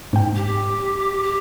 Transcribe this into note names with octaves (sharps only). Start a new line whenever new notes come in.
G#2 G5
G4
G4